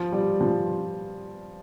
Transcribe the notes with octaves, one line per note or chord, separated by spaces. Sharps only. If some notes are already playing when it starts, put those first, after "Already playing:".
Already playing: F3
G3
F3